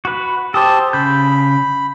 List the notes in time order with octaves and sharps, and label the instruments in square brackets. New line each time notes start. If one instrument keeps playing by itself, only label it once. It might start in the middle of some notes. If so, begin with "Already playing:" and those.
[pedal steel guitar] F#4 B4
[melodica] G4 A5 D#6 [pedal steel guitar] A4 C5
[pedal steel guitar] C#3 G6 [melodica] B5